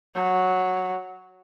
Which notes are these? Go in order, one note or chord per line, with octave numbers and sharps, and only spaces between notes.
F#3